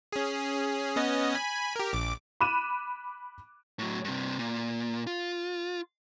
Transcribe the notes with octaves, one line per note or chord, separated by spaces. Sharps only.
C#4 G#4
B3 C#4 D#5
G#5 B5
G4 A#4
A#1 D6
B5 D6 F#6 D#7 E7
A2 F#3
G2 C3
A#2
F4